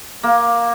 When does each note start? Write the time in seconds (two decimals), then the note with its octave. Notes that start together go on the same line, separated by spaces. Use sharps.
0.23 A#3